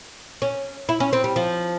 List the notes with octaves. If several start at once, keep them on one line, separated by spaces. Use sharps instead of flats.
C#4
E4
C#4
C4
G3
F3